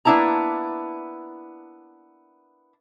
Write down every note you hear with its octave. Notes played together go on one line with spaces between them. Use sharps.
A#3 B3 D4 E4 A5 A#5